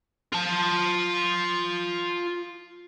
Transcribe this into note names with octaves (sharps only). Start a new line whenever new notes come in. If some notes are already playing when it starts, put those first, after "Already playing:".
F4 A5